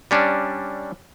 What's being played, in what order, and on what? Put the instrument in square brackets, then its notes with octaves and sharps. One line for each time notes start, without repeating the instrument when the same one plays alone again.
[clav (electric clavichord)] G3 C#4 D4